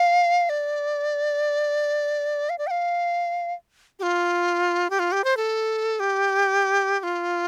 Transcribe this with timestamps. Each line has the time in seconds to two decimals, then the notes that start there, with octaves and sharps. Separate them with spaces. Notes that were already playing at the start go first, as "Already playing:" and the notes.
Already playing: F5
0.49 D5
2.49 F5
2.58 D5
2.67 G5
2.71 F5
3.99 G4
4.03 F4
4.90 G4
4.99 F4
5.12 G4
5.24 C5
5.37 A4
6.00 G4
7.00 G4
7.03 F4